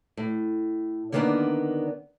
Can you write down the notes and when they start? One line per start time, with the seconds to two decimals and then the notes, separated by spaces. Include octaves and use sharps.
0.17 A2
1.12 D3 D#3 A#3 B3 C#4 D4